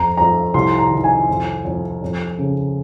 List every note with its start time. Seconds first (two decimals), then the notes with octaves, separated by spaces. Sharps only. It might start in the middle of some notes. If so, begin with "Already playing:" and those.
Already playing: F2 A#5
0.17 F2 A#5
0.54 C2 C6
0.79 A#5
0.91 D#3
1.04 G#5
1.29 F2
1.65 F2
2.02 F2
2.39 C#3